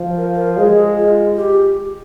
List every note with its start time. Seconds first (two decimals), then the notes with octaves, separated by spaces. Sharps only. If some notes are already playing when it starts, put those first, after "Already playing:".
Already playing: F3
0.17 A#4
0.34 A#4
0.57 G#3 G#4
0.97 F4
1.36 G4